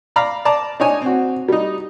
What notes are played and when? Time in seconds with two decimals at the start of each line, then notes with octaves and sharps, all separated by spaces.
0.16 D5 F5 A#5 B5
0.45 D5 A5 A#5
0.80 D4 D#4 C#5 G#5
1.02 C4 F#4
1.48 G3 D#4